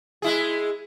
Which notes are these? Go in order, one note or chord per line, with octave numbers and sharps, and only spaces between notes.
G#3 E4 G#4